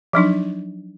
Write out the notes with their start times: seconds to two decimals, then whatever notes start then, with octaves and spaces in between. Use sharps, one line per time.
0.13 F3 F#3 D4 D#4